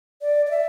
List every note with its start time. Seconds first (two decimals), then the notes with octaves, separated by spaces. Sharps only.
0.21 D5
0.46 D5
0.51 E5